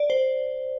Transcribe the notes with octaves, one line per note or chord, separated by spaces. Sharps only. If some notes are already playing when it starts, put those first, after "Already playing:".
Already playing: D5
C5